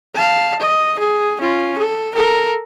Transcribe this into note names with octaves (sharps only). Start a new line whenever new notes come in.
F5 A5
D#5
G#4
C#4 F4
A4
A4 A#4